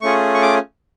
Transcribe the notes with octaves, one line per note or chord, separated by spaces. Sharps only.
A3 C#4 F4 G#4 C#6
C#6
D6